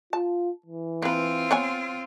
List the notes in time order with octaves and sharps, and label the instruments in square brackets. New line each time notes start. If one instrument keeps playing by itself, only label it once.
[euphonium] F4 [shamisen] A5
[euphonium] E3
[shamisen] A#3 B4 [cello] C4 F4
[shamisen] B3 C#5 G#5